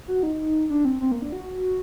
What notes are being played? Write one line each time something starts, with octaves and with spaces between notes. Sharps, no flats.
F#4
D#4
D4
C4
C4
A#3
D4
F#4